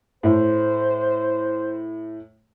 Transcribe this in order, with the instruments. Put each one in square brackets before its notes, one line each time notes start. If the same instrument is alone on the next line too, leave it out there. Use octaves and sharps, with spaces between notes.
[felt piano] A2 [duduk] C5